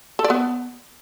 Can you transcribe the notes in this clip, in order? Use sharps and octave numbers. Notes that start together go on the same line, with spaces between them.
A4
D5
B3